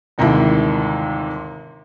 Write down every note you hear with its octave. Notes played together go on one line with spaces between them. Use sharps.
G1 D#2 G#2 C3 E4